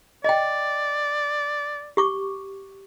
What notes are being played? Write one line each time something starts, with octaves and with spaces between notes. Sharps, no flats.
D5 D#5 G5
G4 C#6 D6